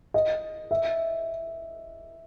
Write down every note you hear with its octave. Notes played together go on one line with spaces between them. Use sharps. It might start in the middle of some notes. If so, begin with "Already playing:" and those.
D#5
E5